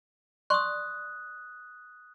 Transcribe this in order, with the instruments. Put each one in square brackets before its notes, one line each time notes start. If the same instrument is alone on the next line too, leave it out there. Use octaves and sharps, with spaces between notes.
[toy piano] D5 C6 C#6 [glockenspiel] D#6 F#6